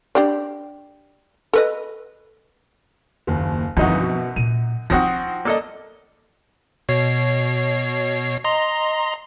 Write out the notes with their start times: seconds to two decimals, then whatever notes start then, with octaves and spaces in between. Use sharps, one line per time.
0.15 D4 G4 D5
1.53 A4 B4 D#5
3.27 F#1 D#2
3.77 G1 F#2 E3 F3 C4 D#4 F#4
4.00 B2
4.36 A#2 D#7
4.90 F3 C4 D4 D#4 F#4 F#5 D#6 A#6
5.45 A#3 A4 D5 D#5
6.89 B2 C#5 C7
8.44 D#5 A#5 C6